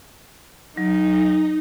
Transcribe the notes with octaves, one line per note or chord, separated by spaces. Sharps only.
F#3 D#4